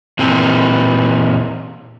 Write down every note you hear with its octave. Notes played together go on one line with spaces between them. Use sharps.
A#2 E3 C4